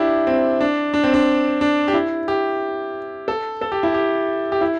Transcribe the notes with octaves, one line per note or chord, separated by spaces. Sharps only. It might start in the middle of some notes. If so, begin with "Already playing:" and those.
Already playing: D4 E4 G4
C4
D4
D4
C4
D4
D4
G4
E4
G4
A4
A4
G4
E4
G4
G4
E4